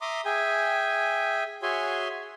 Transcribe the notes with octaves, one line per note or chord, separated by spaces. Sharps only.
E5 A#5 C6 D6 D#6
G#4 E5 G5 G#5
F#4 G#4 C#5 E5 G#5 C6